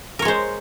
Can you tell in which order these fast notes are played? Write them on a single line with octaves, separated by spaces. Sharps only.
A#4 C#5 G#3 C5